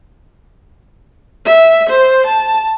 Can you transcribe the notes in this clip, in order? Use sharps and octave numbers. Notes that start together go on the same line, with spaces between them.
E5
C5
A5